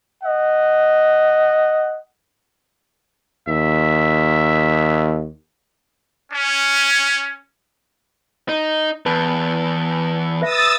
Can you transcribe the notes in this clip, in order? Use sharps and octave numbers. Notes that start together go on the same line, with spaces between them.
D#5 F#5
D#2 E5
C#4
D#4
E2 B4 A5
B4 E5 D#6 E6 A6 A#6